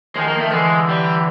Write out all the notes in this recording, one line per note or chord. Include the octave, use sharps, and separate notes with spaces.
D#3 F3 G#3
A#3
A3
D3 E3 G#3
G3